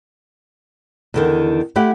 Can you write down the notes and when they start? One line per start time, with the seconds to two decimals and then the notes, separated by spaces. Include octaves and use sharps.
1.14 E2 D3 D#3
1.76 A3 E4 G4 F#5